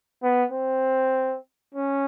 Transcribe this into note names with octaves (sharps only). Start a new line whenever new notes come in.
B3
C4
C#4